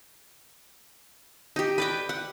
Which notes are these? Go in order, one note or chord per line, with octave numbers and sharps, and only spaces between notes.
D#4 G4
B4 D5 G5
F#5